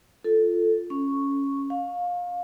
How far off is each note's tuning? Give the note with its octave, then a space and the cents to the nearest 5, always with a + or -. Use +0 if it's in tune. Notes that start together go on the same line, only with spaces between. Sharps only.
F4 -5 A4 +0
C#4 +0 C#6 +0
F5 +25 C#6 -20